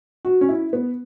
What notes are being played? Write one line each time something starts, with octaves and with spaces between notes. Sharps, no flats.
F#4
C#4
E4
B3